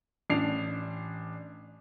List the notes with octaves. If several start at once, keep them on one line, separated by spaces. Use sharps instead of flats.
A1 D4 C7 F7